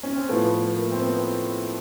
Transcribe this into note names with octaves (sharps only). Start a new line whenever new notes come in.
C#4
C4
A2 F3 A3 B3
B3
A#3
C4
B3